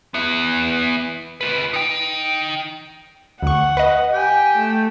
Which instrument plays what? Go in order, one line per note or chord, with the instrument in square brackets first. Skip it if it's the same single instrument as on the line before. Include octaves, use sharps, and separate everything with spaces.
[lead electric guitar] B3 E4
F4 B4
D#4 G5
[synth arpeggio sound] D2 C#6 [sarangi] F#5
[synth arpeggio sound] B4 D#5
[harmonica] G4 G5 [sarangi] G#5
[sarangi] A3